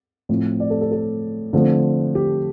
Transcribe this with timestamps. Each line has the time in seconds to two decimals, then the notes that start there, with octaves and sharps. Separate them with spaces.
0.29 A2 F3 C4
0.60 D5
0.70 A4
0.81 A4
0.91 A4
1.53 D3 F3 A3 C4
2.15 G4